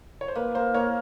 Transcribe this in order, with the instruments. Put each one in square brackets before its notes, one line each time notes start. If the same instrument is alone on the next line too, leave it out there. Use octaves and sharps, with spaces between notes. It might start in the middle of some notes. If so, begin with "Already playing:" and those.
[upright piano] C#5
C5
[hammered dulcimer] A#3 [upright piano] B4
[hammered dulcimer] A#3 [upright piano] C5
[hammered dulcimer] A#3 [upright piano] C#5